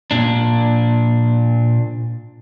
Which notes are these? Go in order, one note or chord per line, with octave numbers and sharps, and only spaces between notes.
A#2 D4